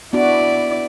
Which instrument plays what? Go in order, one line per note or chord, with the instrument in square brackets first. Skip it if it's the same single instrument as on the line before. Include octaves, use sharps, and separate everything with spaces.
[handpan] B3 D4 F#4 [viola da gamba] E4 D5